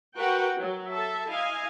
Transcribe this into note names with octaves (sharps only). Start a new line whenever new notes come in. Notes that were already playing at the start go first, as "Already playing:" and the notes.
F#4 A#4 B4 F#5 G5
F#3
A4 E5 A5
E4 D#5 F5 G#5